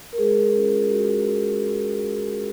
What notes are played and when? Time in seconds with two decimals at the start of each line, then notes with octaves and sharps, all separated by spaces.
0.13 A#4
0.18 G#3 G#4
0.55 C#4 F4
0.90 G#3 F#4
1.27 C#4 F4